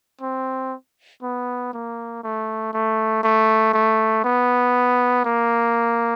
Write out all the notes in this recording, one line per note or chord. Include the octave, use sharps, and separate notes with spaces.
C4
B3
A#3
A3
A3
A3
A3
B3
A#3